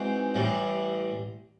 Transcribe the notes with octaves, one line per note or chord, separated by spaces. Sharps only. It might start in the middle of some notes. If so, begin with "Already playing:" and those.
Already playing: E3 G#3 C4 D#4 F#4
A1 A2 E3 G3